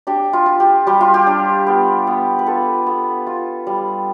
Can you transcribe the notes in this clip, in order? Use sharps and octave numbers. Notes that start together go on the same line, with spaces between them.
D4 G4
F4
F4
G4
G3 G4
F4
G4
D4
B3
B3
B4
B3 F4 A4
B3
F4
G3